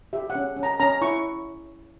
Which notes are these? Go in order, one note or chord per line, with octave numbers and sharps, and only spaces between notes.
G4 E5
F#5
C#4
C#4
A#5
C#4 A#5
E4 C#6